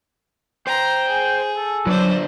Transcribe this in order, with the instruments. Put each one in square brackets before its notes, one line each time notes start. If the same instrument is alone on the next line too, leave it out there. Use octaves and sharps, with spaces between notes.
[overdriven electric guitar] C5 [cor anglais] G5 [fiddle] A#5
[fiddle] G#4
[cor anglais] A4
[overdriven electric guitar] D3 B4 [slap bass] F#3 [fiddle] D4 C5